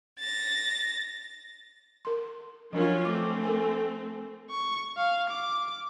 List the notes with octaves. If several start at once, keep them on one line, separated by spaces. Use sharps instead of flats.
A6 A#6
A#4 C6
F3 F#3 C#4 D4 F4 A#4
A3 C4 D6
A4 A#4 G#5
C#6
F5
D6